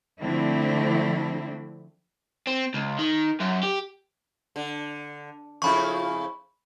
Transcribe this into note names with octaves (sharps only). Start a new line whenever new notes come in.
D3 F3 A3 C4 D4 E4
C4
C#2
D#3
F#2
G4
D3
F2 C#3 E4 B5 C#6